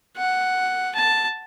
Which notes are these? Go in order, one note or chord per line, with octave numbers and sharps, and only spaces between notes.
F#5
A5